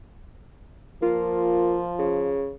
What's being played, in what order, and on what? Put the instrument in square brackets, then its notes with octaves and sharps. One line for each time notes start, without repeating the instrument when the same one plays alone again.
[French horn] F3 [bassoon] A#3 [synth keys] F4
[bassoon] C#3